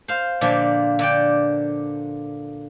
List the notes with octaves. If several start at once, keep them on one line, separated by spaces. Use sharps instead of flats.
C5 F5
A#2 D3 F3
D3 D5 G5